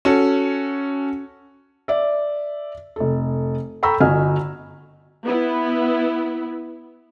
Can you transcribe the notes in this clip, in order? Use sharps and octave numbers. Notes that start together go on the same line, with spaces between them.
C#4 F#4 A4
D5 E5
F1 A4
A4 G5 A#5 B5 C#6 E6
G1 F#4 D#5 G#5 F6
B3 E4